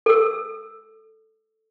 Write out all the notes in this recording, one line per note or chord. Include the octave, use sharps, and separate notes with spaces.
A4 E6